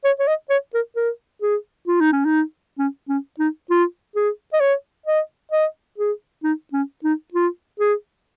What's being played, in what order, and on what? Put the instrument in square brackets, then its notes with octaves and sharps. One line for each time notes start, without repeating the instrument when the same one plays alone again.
[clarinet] C#5
C#5
D#5
C#5
A#4
A#4
G#4
F4
D#4
C#4
D#4
C#4
C#4
D#4
F4
G#4
D#5
C#5
D#5
D#5
G#4
D#4
C#4
D#4
F4
G#4